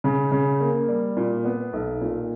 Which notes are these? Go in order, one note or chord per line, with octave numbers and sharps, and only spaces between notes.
C#3
C#3
A#3
G3
A#2
B3
B1
A#2